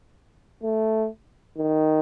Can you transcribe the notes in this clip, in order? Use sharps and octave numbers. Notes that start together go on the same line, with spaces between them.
A3
D#3